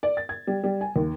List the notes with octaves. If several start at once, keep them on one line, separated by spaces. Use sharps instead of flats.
D5
A6
G#6
G3
G3
G#5
D#2